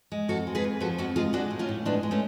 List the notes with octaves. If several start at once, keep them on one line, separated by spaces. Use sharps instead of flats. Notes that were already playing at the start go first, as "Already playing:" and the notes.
G#3
F2 F#4 A4
G#3
G#4 B4
F2
F3 F#4 A4
F2 F#4 A4
G#3 F4 G#4
G#3 D4 F#4
A2
C#4 F4
A2
G#3 B3 D4
G#3
A3 C#4